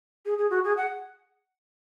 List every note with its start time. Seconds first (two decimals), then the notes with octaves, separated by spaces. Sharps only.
0.25 G#4
0.38 G#4
0.50 F#4
0.64 G#4
0.77 F#5